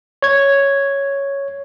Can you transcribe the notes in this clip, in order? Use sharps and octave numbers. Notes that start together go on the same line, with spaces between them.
C#5 G#6